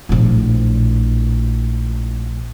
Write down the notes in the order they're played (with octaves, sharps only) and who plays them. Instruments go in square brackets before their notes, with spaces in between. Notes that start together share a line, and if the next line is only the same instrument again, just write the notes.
[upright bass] A#1 A2